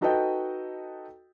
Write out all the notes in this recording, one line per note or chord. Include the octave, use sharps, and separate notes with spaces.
D#4 F#4 A4 B4 D#5 G5